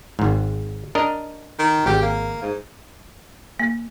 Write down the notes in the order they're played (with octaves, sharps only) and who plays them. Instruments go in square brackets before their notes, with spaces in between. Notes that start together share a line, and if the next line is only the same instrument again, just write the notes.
[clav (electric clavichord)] G#1 G#2
D4 A#4 D#5
[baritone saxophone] D#3
[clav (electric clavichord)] G#1 [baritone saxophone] G4
[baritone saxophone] A#3
G#2
[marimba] A#3